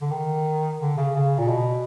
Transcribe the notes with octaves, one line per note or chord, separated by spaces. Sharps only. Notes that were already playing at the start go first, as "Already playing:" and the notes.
D3
D#3
D3
C#3
C#3
A#2
B2